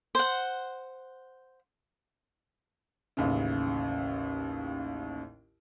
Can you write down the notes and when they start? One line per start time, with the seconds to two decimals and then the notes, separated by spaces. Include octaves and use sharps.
0.15 C5 F#5
3.17 A1 D#2 C#3